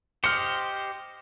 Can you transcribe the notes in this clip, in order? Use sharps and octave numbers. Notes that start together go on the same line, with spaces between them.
G4 C5 D#5 F6 C#7